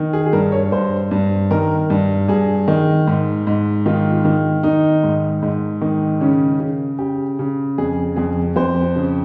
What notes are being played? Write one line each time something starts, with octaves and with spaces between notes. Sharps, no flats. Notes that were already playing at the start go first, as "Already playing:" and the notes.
Already playing: D#3
G#4
G#4
G2 A#4
C#5
G2 C5
G2
D#3 A#4
G2
G2 G#4
D#3
G#2
G#2
D#3 F4
D#3
D#3 D#4
G#2
G#2
D#3
C#3 C#4
C#3
C#3 G4
C#3
F2 G#4
F2 G#4
F2 C5
C#3